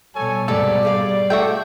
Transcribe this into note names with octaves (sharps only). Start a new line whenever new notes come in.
B2 G3 A4 C#5 G#5
D#2 G#2 C3 A4 D5
G4 G#4 F5
A3 F#4 G#4 A4 E5 G5